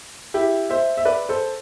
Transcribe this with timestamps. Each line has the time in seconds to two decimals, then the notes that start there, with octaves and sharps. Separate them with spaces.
0.34 E4 G4
0.70 C5 E5
0.97 E5
1.05 B4 D5
1.29 A4 C5